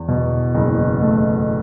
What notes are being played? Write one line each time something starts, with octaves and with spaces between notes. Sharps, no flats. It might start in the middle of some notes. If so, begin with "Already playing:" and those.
Already playing: E2
B2
F#1
A3